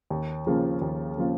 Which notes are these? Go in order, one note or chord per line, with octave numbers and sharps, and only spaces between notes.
D#2
C#3 F3 A#3 F4
D#2
C#3 F3 A#3 F4